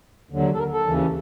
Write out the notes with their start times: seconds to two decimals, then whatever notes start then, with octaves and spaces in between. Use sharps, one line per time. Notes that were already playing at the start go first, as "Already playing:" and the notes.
0.30 D#2 D3 F#3
0.54 A4
0.59 A#4
0.72 A4
0.87 D#2 C#3 E3